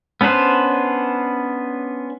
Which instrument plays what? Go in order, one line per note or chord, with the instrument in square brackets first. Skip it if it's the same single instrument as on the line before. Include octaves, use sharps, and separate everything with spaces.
[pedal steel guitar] B3 C#4 D4 B4 C5